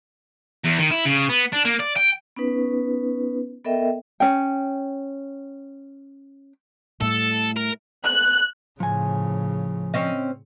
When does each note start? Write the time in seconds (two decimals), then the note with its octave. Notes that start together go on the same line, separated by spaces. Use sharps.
0.64 E2
0.78 D#3
0.90 E4
1.05 C#3
1.29 B3
1.53 D4
1.65 A#3
1.80 D5
1.97 G5
2.36 B3 C#4 D#4 B4
3.65 B3 A4 A#4 D#5 E5 G5
4.20 C#4 G5
7.01 A2 G3 A4
7.56 A#4
8.05 F#6
8.80 A2 C#3 F3 G#5
9.94 C4 C#4 D#5